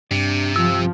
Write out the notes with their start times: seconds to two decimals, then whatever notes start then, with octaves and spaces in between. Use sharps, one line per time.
0.11 G2 C3 D4
0.56 F3 E6